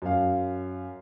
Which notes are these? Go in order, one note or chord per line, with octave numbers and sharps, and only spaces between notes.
F#2 F5